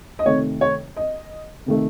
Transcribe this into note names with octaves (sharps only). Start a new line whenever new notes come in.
D#5
F2 C3 D#3 A3 C#5
C#5
D#5
C3 D#3 A3